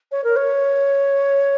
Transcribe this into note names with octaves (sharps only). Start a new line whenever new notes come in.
C#5
A#4
C#5